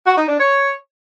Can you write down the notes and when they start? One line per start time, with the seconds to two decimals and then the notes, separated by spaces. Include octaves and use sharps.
0.07 F#4
0.18 D#4
0.29 D4
0.39 C#5